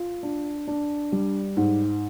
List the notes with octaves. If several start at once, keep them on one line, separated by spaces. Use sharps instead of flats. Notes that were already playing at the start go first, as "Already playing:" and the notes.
Already playing: F4
D4
D4
G3
G#2